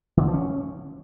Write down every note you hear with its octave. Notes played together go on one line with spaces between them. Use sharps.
D#3
D3
F3
C#4